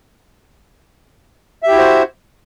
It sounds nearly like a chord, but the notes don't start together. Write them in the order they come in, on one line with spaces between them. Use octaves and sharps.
E5 G4 E4 F#4 C5